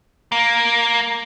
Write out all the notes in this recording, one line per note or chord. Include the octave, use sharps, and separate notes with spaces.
A#3